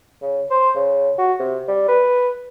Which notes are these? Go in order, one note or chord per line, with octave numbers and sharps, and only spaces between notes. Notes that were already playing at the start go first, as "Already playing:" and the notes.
C#3
C5
C#3
F#4
C3
G3
B4